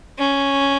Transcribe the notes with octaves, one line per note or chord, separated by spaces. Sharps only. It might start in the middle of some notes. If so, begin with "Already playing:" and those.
C#4